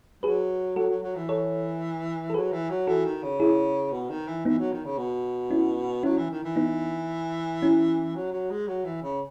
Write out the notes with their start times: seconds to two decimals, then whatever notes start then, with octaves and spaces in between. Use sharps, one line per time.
0.23 F#3 G#4 B4
0.76 F#3 F#4 A4
0.90 F#3
1.02 F#3
1.16 E3
1.29 A4 C#5
2.30 A4
2.34 F#3 G#4 B4
2.53 E3
2.70 F#3
2.87 E3 F#4 A4
3.05 D#3
3.23 C#3
3.40 E4 G#4
3.92 B2
4.10 D#3
4.28 E3
4.45 E3 B3 D#4
4.59 F#3
4.72 D#3
4.85 C#3
4.98 B2
5.51 C#4 E4
6.03 F#3 C#4 E4
6.18 E3
6.30 D#3
6.44 E3
6.56 B3 D#4
7.62 C#4 E4
8.15 F#3
8.32 F#3
8.51 G#3
8.68 F#3
8.85 E3
9.03 C#3